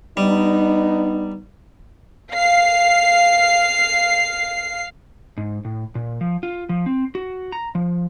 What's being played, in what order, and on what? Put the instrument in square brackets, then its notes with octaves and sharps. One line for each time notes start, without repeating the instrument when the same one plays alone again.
[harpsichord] G3 [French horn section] B3 D4 D#4
[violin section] F5 C7
[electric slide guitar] G#2
A2
A#2
F3
F4
F3
C4
F#4
A#5
F3